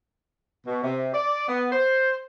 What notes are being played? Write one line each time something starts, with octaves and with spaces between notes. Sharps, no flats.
B2
C3
D5
B3
C5